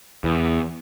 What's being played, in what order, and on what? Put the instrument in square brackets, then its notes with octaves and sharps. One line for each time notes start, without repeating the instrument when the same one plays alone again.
[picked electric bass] E2